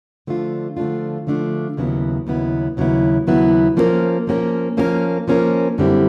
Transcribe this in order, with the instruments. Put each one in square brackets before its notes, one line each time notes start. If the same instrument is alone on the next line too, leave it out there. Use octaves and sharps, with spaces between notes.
[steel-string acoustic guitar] D3 F3 A3 D4 F4
D3 F3 A3 D4 F4
D3 F3 A3 D4 F4
D#2 C#3 F#3 B3 E4
D#2 C#3 F#3 B3 E4
D#2 C#3 F#3 B3 E4
D#2 C#3 F#3 B3 E4
F3 A#3 C#4 F#4 A#4
F3 A#3 C#4 F#4 A#4
F3 A#3 C#4 F#4 A#4
F3 A#3 C#4 F#4 A#4
F#2 D3 G3 C4 E4